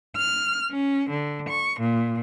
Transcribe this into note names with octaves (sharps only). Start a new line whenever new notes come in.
F6
C#4
D3
C#6
A#2